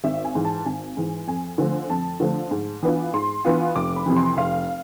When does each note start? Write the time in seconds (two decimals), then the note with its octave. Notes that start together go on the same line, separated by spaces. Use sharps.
0.04 G#1 E5
0.25 G#5
0.35 G#2 E3
0.45 A5
0.66 G#1 G#5
0.97 G#2 E3
1.28 F2 G#5
1.58 D3 F3 A3 C4
1.90 F2 A5
2.20 D3 F3 A3 C4
2.51 G#2
2.83 E3 B3 D4 F4
3.14 G#2 C6
3.45 E3 B3 D4 F4
3.75 F1 D6
3.96 B5
4.06 F2 C3 E3
4.17 C6
4.37 F1 F5